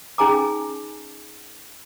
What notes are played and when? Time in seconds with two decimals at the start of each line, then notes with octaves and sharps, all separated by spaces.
0.18 C#4 D#4 G#4 G#5 A#5 D6